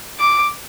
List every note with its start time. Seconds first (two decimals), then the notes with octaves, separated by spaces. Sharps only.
0.20 D6